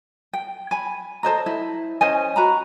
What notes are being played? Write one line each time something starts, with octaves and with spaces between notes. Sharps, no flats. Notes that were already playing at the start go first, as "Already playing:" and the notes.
G5
G#5 B5
A4 C5 D#5 A#5
E4
C#4 C5 D#5 G#5
F#4 A#5 B5